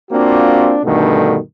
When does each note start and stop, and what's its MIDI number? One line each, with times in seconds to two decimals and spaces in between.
0.11 0.78 58
0.11 0.78 60
0.11 0.78 62
0.11 0.78 65
0.11 0.78 66
0.83 1.37 43
0.83 1.37 47
0.83 1.37 50
0.83 1.37 51
0.83 1.37 57